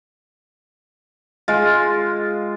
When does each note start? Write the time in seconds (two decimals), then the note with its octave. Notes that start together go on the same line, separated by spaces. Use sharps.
1.48 G#3 F4